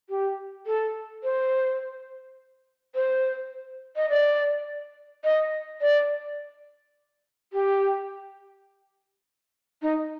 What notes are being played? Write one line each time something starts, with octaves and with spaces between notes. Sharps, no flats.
G4
A4
C5
C5
D#5
D5
D#5
D5
G4
D#4